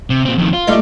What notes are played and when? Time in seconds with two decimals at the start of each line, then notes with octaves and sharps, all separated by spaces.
0.10 C3
0.25 A#2 C4
0.38 F2 D#3
0.54 F4
0.67 G3 A3 D#4